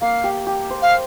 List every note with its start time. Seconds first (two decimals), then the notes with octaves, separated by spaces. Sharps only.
0.01 A#3 F5
0.24 G4
0.47 G4
0.70 C5
0.82 F5